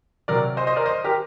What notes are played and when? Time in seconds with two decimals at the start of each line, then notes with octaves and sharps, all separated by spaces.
0.28 C3 F#3 A#4 D5
0.57 C5 D#5
0.67 C5 D#5
0.76 A#4 D5
0.86 C5 D#5
1.04 G4 A#4